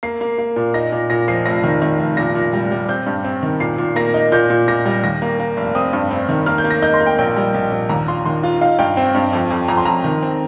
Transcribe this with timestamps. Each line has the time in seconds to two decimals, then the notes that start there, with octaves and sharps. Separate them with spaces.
0.03 A#3 C7
0.21 A#3
0.38 A#3
0.56 A#2
0.74 D#4 A#6
0.92 A#2
1.10 A#2 A#6
1.28 F3 C7
1.46 F1 A#6
1.64 D#3
1.82 D#3
1.99 F1
2.17 A#2 A#6
2.35 A#2
2.53 G3
2.71 G3
2.88 C4 G6
3.06 G2
3.24 C4
3.43 D#3
3.60 A#2 C7
3.78 A#2
3.96 A#3 A#6
4.14 D#4
4.32 A#2 G6
4.50 A#2
4.68 A#2 A#6
4.85 G3
5.04 D#2 A#6
5.22 A#3
5.40 A#3
5.57 F1
5.75 C4 D#6
5.93 G2
6.11 C4
6.29 D#3
6.46 A#3 F6
6.58 G6
6.64 A#3
6.71 A#6
6.82 D#4 G6
6.94 C6
7.01 A#3
7.06 G5
7.18 A#1 G5
7.36 G3
7.54 A#1
7.71 A#1
7.89 D#2 A#5
8.08 F4 C6
8.25 D#3 C6
8.43 F4
8.61 D#4 F5
8.79 G2 G5
8.97 C4
9.15 G2
9.33 F2
9.51 F2
9.68 F2 A#5
9.77 C6
9.85 F2 A#5
10.04 D#3
10.22 C4